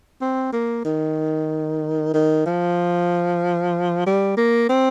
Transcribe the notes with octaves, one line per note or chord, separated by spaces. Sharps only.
C4
A#3
D#3
D#3
F3
G3
A#3
C4